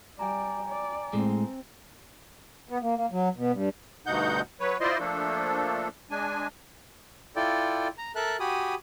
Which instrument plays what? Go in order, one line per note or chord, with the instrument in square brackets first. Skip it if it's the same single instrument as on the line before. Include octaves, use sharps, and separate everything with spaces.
[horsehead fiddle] G3 D5 [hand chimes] G5 G#5 A#5
[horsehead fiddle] D5
[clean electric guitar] A2 G#3 [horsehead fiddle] C4
[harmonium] B3
A#3
A#3
F#3
B2
G2
[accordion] D2 G2 B2 D#4 F#5 G6
F#3 B4 C#5
E4 F4 C5 D5 D#5 C6
F3 A3 A#3 D4 A4
G#3 D4 G#5
[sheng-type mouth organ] E4 F4 A4 D5 G5
A#5
A4 A#4 E5 A5 F#6
F#4 G4 G#5 B5 D#6